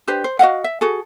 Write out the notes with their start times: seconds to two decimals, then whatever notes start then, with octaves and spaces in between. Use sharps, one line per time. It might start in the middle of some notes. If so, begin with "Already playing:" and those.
0.07 D4 G4 B4 C5
0.24 C5
0.39 F#4 D#5 F5 F#5
0.64 E5
0.81 F#4 G#4 A4